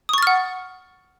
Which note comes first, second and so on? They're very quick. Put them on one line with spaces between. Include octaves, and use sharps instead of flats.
D#6 C#6 A6 F6 F#5